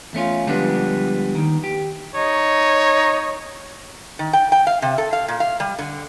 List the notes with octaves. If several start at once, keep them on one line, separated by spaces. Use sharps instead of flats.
E2 A3 C#4 F4
D3 F3 G3 G#3 B3 D4
D#2 D#3
G4
D#4 C#5
D#3
G5
G5
F5
C3
A4
F5
A#2
F5
G3
D3